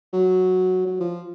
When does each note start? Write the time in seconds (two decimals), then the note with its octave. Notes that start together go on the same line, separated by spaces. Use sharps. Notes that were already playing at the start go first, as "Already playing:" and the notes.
0.13 F#3
0.87 F#3
1.00 F3